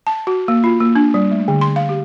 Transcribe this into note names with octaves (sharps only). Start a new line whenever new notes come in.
A5
F#4
A#3
F4
A#3
D4
G3
A3
D3
C6
F5
G4